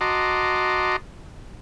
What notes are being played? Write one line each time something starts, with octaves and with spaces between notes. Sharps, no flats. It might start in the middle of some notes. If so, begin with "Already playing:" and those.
F#4 D#5 A5 A#5 C6 D6